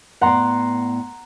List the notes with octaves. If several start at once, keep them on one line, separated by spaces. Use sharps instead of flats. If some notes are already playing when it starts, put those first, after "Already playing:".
A2 B3 D5 F#5 A#5 C6